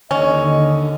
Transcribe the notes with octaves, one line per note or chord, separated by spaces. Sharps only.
D#2 D3 C#4 D#5